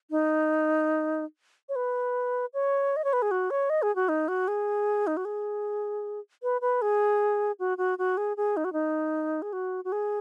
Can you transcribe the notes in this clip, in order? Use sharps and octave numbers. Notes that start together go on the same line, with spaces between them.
D#4
C#5
B4
C#5
D#5
C#5
B4
G#4
F#4
C#5
D#5
G#4
F#4
D#4
F#4
G#4
D#4
F#4
G#4
B4
B4
G#4
F#4
F#4
F#4
G#4
G#4
D#4
F#4
D#4
G#4
F#4
F#4
G#4